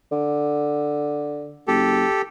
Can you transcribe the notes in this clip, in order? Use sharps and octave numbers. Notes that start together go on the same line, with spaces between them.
D3
F#1 G4 A4